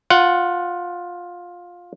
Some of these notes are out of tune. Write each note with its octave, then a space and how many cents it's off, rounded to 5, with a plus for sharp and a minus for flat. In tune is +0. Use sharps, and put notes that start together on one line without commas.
F4 +15 F#5 +0